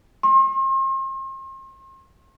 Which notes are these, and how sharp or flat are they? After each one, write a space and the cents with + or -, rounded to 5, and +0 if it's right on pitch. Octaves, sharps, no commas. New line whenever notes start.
C6 +40